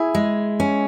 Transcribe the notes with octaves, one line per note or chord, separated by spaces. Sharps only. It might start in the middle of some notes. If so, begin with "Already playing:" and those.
Already playing: E4 G#4
G#3
C#4